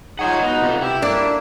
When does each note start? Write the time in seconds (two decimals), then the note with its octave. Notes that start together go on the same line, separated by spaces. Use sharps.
0.19 D#4 F4 G#4 C#5 F#5 G#5
0.42 B3 D#4 F#4
0.62 C3 F4 A4
0.81 E4 G4
1.02 A#3 D4